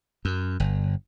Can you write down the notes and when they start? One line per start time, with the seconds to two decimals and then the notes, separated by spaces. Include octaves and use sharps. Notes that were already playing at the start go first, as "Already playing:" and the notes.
0.25 F#2
0.60 G1